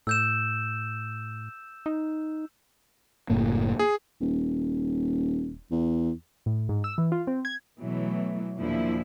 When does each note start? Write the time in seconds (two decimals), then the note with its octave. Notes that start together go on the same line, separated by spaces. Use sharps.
0.07 A2 E6 G6 E7
1.86 D#4
3.30 F#1 A2 A#3
3.79 G#4
4.20 D#1
5.71 E2
6.46 A2
6.69 G#2
6.84 E6
6.98 E3
7.12 F4
7.27 C4
7.45 G#6
7.80 B2 E3 F#3 A3
8.57 D#2 A#2 F3 D4 E4